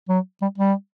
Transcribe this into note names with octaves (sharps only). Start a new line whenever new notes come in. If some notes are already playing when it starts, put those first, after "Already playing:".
F#3
G3
G3